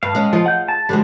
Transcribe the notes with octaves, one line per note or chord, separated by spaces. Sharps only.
G2 F5
G#3 C#4
F3 F4 G#4 D#5
F#5 G6
A5
D3 F3 G3 G#3 F#4